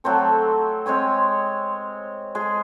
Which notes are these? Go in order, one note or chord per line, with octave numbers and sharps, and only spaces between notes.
F#3 A3 C4 A4
G#3 C4 C#5 G#5
G#3 G#4